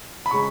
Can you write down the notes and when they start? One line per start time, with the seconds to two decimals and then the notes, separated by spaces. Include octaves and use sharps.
0.26 B5
0.31 C#3 G#3 C#6